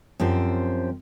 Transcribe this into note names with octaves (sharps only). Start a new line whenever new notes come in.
F#2 F3 C4 G4 C5